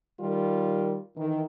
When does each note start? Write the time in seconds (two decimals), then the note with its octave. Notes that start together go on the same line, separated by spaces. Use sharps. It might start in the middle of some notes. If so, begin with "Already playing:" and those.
0.19 D#3 G3 F4 A#4
1.16 D#3 E3